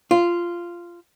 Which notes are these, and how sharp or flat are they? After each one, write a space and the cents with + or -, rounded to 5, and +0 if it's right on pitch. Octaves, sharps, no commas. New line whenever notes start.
F4 -10